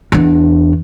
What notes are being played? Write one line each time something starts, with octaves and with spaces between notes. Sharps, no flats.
E2 D4